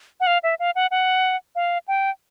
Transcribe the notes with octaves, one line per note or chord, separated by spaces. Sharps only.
F#5
F5
E5
F5
F#5
F#5
F5
G5